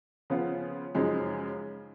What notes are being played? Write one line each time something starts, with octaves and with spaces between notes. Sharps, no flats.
C#3 F3 B3 F4
F#2 C#3 F3 G#3 D#4